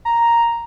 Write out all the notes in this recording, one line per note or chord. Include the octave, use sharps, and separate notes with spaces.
A#5